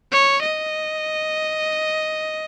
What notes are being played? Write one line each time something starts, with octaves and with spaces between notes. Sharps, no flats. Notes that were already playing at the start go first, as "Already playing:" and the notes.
C#5
D#5